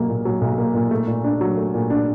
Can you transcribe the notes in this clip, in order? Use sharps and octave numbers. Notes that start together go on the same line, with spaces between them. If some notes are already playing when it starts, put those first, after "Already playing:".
Already playing: B1 F#3 A#3
A#2
F#3
B1
A#3
A#2
A3
A#2
D4
F#3
A3
A#2
D4